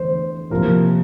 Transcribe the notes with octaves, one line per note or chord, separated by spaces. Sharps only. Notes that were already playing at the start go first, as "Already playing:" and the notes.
Already playing: E2 D3 A3 C5
C3 F3 A#3 A#4